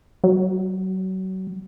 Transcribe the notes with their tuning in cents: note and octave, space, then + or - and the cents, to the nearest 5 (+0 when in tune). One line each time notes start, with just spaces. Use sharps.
F#3 +30